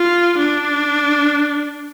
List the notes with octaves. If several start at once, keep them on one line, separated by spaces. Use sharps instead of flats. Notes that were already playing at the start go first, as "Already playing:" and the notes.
Already playing: F4
D4